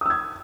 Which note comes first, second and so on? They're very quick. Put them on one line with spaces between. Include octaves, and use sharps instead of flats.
D#6 E6 G#6